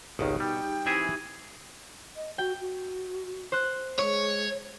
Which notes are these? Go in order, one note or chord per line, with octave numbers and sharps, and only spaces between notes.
G#1 C#2 B2 D#3 D#4 G4
G3 G5
E3 C4 E4 G#4 E5
D#5
F#4 G5
F#4
C5 F#6
G#3 C#5